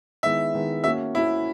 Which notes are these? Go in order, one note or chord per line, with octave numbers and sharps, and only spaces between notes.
D#3 G#3 B3 E4 E5
D#3 G#3 B3 E4
A#3 C#4 F#4 E5
A#3 C#4 E4 F#4